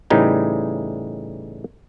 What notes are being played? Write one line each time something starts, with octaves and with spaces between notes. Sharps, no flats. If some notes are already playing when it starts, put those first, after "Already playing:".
A2 C#3 E3 G3 D#4 D#5